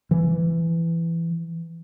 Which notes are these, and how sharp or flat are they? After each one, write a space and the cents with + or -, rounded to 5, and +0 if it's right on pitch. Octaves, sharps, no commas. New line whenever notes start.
E3 +15